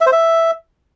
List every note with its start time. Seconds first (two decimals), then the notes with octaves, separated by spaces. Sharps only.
0.01 E5
0.07 C5
0.12 E5